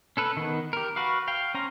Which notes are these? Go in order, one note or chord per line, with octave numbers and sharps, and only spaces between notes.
C#4 A4 B4
D#3 B3
G4 A#4
F#4 B4 F5
F5 G5
C#4 C5 A#5